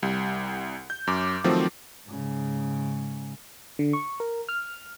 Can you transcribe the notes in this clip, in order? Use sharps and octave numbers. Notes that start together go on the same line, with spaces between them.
C2 G3
G6
F#2 D6
D#3 F3 F#3 A3 C4
G#2 C#3
D3
C#6
A#4
F6